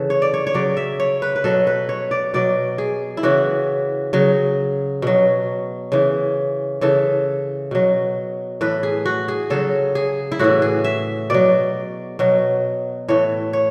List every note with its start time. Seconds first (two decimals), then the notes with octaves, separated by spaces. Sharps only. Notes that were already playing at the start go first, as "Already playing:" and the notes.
Already playing: C#3 E3 A4
0.10 C#5
0.22 D5
0.34 C#5
0.47 C#5
0.54 C#3 F#3 D5
0.77 E5
1.00 C#5
1.22 B4
1.36 B4
1.44 B2 F#3 A4
1.67 B4
1.89 C#5
2.11 D5
2.34 B2 F#3 D5
2.78 G#4
3.17 E4
3.23 C#3 E3 F#4
4.13 C#3 F#3
5.02 B2 F#3
5.92 C#3 E3
6.81 C#3 E3 A4
7.71 B2 F#3
8.61 A2 E3 B4
8.83 G#4
9.05 F#4
9.28 G#4
9.50 C#3 F#3 A4
9.95 G#4
10.32 E4
10.39 A2 E3 F#4
10.62 G#4
10.84 E5
11.30 B2 F#3 D5
12.19 B2 F#3
13.08 A2 E3 C#5
13.53 C#5